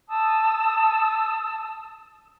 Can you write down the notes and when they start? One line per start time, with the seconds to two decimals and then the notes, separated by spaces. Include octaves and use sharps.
0.08 A5 D#6 E6